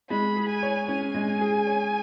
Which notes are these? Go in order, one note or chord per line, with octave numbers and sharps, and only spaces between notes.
G#3 B5
G#4
G#5
C#5
C#4 G#5
G#3
G#4
C#5